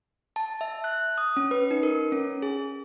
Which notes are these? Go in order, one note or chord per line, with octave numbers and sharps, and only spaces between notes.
A5
E5
F#6
D#6
C#4
B4
D#4
A#4
C#4
G#4